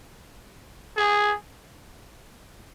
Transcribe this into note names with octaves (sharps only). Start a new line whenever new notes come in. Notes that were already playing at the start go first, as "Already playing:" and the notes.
G#4